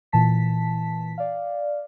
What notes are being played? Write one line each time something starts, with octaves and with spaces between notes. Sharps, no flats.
A#2 E3 A5 B6
D5 F5